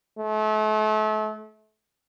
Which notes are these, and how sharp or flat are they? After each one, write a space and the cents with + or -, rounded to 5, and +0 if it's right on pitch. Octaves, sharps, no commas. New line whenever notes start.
A3 -35